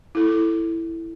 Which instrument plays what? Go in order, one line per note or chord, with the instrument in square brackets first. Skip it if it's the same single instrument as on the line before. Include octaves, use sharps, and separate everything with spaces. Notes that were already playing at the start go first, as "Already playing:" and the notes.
[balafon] E4 A4